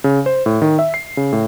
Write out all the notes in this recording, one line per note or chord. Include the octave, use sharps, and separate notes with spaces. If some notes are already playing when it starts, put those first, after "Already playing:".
C#3
C5
A2
D#3
E5
C7
C#3
A2